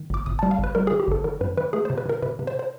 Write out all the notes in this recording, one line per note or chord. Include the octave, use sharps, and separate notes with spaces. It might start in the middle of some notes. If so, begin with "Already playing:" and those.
Already playing: D#3
G1 D6
G1 D#6
A5
G3
F5
G1
B4
G3 A#4
G#4
D#3
G4
G1 A4
D#3 A#4
F#2 B4
D#3 B4
A3 G#4
C5
C3
B4
C3 A#4
C3 B4
C3
C5
C5